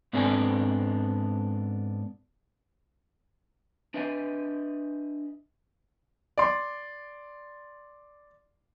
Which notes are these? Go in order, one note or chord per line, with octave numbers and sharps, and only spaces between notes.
G#2 B3 C4 D4 A4 G#5
D4 B4 D#5 E5 G#5
D5 C6